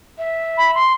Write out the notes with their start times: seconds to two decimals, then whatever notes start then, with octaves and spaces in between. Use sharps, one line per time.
0.18 E5
0.58 B5
0.75 C6